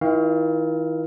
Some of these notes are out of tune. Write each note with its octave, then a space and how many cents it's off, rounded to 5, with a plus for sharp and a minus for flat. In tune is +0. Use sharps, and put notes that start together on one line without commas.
D#3 +45 F4 -40 F5 +0